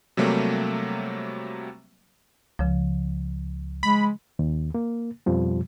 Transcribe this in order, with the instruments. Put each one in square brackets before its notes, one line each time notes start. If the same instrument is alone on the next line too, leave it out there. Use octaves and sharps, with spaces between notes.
[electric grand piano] C3 F#3 G3 A3 A#3
[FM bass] C#2 [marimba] C#3 F3
[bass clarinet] G#3 [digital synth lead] B5
[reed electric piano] D#2
A#3
F2 B2 F3 G3